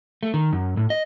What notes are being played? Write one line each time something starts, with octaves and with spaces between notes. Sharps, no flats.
A3
D#3
F#2
A2
D#5